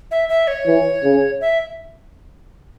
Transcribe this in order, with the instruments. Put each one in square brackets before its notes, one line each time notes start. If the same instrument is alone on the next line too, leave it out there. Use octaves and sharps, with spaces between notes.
[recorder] E5
E5
C#5
[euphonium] E3
C#3
[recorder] E5